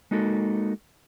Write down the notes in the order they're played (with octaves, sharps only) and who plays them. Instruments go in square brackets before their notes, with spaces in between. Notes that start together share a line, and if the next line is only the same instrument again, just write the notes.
[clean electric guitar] G#3 A#3 D#4 F#4 A4